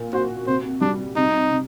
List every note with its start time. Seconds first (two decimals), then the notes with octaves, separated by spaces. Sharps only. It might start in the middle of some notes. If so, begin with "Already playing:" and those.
Already playing: A#2
0.13 F#4 C5
0.47 C3 C5
0.81 G3 D4
1.16 C3 D#4
1.51 C3